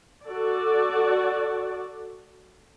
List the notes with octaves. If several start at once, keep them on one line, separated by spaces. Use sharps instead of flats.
F#4 A4 D5